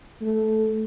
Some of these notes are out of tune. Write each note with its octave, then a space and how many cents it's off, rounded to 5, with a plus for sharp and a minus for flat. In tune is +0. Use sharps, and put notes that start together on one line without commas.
A3 -10